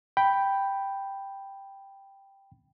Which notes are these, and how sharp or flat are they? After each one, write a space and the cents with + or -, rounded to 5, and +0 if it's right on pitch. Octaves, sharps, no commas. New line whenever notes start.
G5 +0 B5 +0